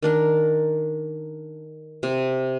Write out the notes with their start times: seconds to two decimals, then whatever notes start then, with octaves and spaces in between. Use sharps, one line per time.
0.03 D#3 D4 A#4
2.03 C3